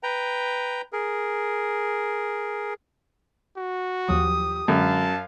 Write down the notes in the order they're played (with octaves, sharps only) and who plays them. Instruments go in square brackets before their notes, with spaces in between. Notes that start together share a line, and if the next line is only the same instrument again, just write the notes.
[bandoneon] B4 G5 A#5
G#4 A#4
[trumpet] F#4
[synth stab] D#2 F3 F#3 [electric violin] G4 D#6
[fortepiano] F#2 [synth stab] D3 G#3 [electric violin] F5 [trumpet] A5